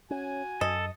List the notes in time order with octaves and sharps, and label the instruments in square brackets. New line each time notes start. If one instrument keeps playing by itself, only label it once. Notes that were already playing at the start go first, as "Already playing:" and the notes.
[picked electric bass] C#4 [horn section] F#4 G#5
[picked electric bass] F#2 [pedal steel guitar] A4 [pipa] D#5